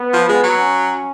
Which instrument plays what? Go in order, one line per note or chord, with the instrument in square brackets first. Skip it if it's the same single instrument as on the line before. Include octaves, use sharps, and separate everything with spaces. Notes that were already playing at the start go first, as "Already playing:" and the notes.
Already playing: [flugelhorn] B3
[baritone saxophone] F3
G#3
F#3
[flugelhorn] C#4